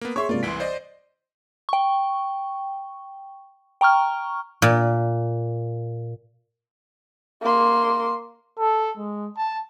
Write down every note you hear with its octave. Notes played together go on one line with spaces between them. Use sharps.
A#3 B3
G#4 C#5 E5 C6 C#6
C3 G#3 A#3 F4 D5
C2 E3 C6 B6 D7
C5 D5 D#5
G5 C#6
G5 A#5 C#6 F6
A#2
A#3 C6
A4
G#3
A5